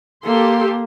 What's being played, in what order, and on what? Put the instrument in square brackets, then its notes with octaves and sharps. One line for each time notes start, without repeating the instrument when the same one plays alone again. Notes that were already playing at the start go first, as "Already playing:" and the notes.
[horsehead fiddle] A#3 [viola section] G4 A4 C6